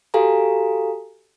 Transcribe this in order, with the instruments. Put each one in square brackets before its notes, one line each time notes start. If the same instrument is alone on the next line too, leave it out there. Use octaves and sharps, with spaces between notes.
[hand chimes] F#4 G4 A4 F5 G#5 A#5